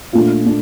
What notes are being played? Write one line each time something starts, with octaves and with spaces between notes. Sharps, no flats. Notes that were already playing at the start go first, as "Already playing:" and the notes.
A#2 A3 D4 F4
A#2 A3 D4